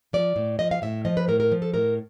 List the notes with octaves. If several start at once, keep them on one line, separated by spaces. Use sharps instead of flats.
F3 D5
A2
F3 D#5
F5
A2 E5
F3 D#5
B4
A2 A#4
A#4
F3
A4
A2 A#4